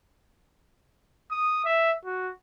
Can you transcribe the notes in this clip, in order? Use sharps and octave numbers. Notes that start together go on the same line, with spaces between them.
D#6
E5
F#4